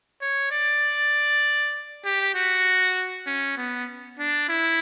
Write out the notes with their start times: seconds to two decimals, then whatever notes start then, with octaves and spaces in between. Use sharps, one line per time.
0.22 C#5
0.51 D5
2.05 G4
2.35 F#4
3.26 C#4
3.57 B3
4.19 D4
4.49 E4